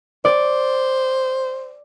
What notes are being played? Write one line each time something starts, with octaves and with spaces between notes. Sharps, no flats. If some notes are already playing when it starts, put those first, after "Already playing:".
C5 D5